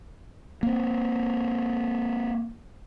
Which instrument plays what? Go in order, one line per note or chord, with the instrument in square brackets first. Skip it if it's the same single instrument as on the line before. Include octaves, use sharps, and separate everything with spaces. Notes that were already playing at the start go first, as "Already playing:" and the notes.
[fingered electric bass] A#3 C4